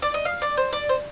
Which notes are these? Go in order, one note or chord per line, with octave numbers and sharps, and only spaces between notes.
D5
D#5
F5
D5
C5
D5
C5